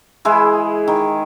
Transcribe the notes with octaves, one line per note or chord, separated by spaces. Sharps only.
E3 G#3 E4 G#4
D#3